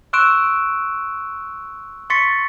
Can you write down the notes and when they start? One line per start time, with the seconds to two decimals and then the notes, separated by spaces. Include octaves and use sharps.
0.13 C6 C#6 E6 F#6 D7 E7
2.10 C6 C#6 A6 B6 C#7